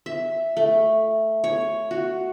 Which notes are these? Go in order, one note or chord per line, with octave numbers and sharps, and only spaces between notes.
E5
A3
C#5
F#4